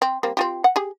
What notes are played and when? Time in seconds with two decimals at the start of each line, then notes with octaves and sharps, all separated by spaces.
0.02 C4
0.23 G3 A#3 C4
0.37 C4 F4 G4
0.64 F#5
0.76 G4 G#4